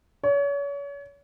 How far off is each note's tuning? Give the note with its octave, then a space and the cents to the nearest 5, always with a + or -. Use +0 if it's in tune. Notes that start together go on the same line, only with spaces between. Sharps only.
C#5 +35